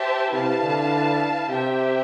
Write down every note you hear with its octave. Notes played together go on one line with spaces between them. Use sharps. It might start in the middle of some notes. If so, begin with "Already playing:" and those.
Already playing: G4 C5 E5 A5
C3 E4 B4 F5 A5
D3
C3 G4 C5 E5 G5